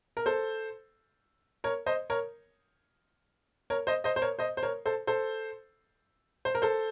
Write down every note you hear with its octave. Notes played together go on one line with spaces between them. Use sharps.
A#4
A4 C5
A#4 C#5
C5 D#5
A#4 C#5
A#4 C#5
C5 D#5
C5 D#5
C5
A#4 C#5
C5 D#5
C5
A#4 C#5
A4 C5
A4 C5
C5
A#4
A4 C5